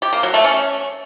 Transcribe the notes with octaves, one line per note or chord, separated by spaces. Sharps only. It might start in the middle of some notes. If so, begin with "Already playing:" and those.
G4
A#3
F#3
A3
C#4